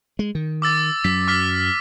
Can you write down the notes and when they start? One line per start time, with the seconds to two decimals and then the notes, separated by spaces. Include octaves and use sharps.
0.19 G#3
0.35 D#3
0.62 D6 E6 A6
1.04 F#2 F#3 B6
1.28 D6 F6 B6